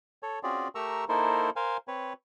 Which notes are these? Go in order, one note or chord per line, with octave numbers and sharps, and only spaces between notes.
A4 C#5
C4 C#4 F4 F#4 G#4 D5
A3 G4 A#4 A#5 C#6 E6
A#3 D#4 E4 A4 A#4 C5
A#4 C5 F5 G#5
C4 B4 C#5